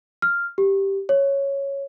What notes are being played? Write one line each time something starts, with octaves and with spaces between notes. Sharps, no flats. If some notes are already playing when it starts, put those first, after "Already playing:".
F6
G4
C#5